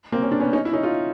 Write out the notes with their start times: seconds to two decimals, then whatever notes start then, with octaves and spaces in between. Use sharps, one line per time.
0.12 A#3 C4
0.22 C#4
0.31 D4
0.40 B3 C#4
0.53 C#4 D#4
0.65 E4
0.73 C#4 D#4
0.83 D#4 F4